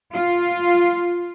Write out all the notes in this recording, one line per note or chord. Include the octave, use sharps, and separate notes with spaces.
F4